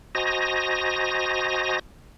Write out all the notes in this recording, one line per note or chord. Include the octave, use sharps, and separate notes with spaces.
F#4 C5 D#5 G#5 A#5 A#6